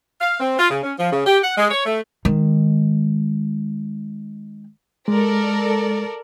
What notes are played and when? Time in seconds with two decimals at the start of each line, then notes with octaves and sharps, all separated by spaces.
0.20 F5
0.39 C4
0.59 F4
0.70 C#3
0.83 C#4
0.99 F3
1.12 C#3
1.26 G4
1.43 F#5
1.57 G#3
1.71 C#5
1.86 A3
2.25 D#3 G#3
5.08 G#3 A4 A#4 D5